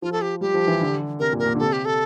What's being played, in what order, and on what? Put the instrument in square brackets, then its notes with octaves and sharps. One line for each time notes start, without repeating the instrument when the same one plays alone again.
[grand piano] F3 [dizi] F4
[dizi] A4
G4
[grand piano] G3 [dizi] G4
[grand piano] F3
E3
D3
[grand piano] C3 [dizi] A#4
[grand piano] A#2
[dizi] A#4
[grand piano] A#2
D3
[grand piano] C3 [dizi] A4
[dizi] G4
A4